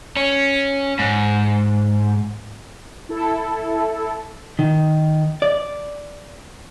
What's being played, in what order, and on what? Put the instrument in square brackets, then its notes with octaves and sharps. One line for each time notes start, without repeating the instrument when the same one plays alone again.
[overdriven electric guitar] C#4
G#2
[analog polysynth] E4 A4
[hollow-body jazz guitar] D#3
D5